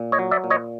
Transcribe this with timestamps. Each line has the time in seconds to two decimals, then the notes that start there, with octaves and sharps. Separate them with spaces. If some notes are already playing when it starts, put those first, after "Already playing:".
Already playing: A#2
0.12 C#5 D#5
0.19 F#3
0.31 D5 E5
0.44 A#2
0.50 C#5 D#5